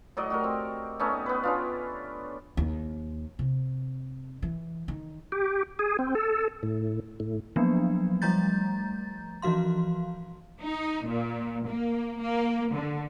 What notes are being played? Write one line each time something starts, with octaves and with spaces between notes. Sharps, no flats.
A2 F#3 D5 D#5
F#4 G4 A#4
C4
A3 B3 C#4 D#4
B3 B4
C#4 D4 F4
D#2
C3
E3
D#3
G4
G#4
C4
A4
A2
A2
F3 F#3 A#3 B3 D4
F3 G3 A3 A#5 G6 A6
E3 F3 F#4 F5 C6
D#4
A#2
A#3
A#3
D3